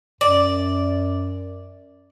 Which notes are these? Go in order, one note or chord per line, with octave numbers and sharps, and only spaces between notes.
F#2 D5